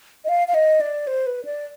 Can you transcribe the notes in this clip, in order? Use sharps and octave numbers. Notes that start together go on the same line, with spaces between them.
D#5
F5
F5
D#5
D5
C5
B4
D5